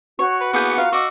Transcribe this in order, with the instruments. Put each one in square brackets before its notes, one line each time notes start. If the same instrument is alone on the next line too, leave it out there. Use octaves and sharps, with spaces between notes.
[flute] F#4 [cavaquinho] C#5
[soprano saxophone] B4
[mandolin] A#3 G6 [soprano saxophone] B3 [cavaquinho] E4 G#4
[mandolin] F4 A#4 [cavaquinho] F5
[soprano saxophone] F#4 [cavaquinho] D#5 F5 [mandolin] C#6 D6 [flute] E6